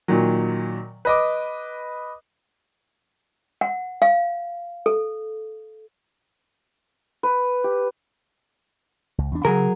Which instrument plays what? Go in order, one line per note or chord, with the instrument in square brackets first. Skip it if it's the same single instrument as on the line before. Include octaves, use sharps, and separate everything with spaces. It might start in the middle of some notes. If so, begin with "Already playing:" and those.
[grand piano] A#2 D#3 F#3
B4 D#5 D6
[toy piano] F#5
F5
A4
[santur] B4
G4
[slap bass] C#2
E2 D4
[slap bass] C#3 [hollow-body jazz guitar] F#3 G#4 A#4